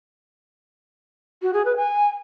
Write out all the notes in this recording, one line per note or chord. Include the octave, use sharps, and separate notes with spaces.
F#4
G#4
B4
G#5